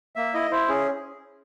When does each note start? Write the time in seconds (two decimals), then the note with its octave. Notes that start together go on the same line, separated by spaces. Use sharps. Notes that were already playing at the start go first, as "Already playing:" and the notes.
0.16 A#3 E5
0.34 E4 D#5
0.51 E4 C5
0.69 C#4 G#4